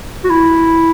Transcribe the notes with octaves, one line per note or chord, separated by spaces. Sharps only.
F#4
E4